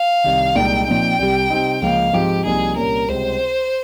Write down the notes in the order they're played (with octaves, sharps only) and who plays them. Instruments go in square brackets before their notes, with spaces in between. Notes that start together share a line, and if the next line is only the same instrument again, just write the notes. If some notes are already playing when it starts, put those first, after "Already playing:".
Already playing: [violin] F5
[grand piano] C2 C3 D#3
[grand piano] C2 A#2 G#3 D#4 [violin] G5
[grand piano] A#2 F3 C4 D#4 [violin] G5
[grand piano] C2 C3 G3
C3 G3 C4 D#4
[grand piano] C#2 C#3 F3 A#3 [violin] F5
[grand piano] G#2 F3 C4 F4 [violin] G4
[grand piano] C2 C3 F3 A#3 D#4 [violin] G#4
[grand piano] C2 A#2 G3 C#4 [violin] A#4
[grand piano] C#2 C3 G3 C4 [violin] C5